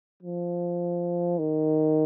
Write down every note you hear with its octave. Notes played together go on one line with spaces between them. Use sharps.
F3
D#3